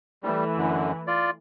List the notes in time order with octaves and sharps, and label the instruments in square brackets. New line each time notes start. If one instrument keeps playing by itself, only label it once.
[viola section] E3 A3 [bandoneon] G3
[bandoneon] F#2 D3
F4 D5